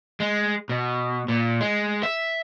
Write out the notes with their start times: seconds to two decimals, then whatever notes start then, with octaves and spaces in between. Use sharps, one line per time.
0.20 G#3
0.69 B2
1.28 A#2
1.61 G#3
2.03 E5